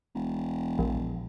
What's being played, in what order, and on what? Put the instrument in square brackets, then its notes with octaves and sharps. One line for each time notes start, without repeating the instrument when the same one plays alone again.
[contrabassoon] E1
[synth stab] A#1